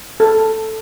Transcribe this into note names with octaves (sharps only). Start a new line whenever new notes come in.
A4